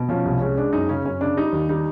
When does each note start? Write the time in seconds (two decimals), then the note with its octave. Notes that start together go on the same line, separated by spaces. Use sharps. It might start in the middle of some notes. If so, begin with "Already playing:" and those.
Already playing: B2
0.09 F3 C#4
0.25 C2
0.41 G#3 C#4
0.57 G#3 D4
0.73 F#2 D#4
0.89 C#3 C#4
1.05 F#2 C#4
1.21 C#3 D4
1.37 G3 D#4
1.53 D#2
1.69 G3 D#4